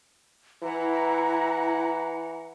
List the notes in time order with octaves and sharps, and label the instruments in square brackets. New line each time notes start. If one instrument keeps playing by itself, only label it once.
[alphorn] E3 [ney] E4 [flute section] F#5 A#5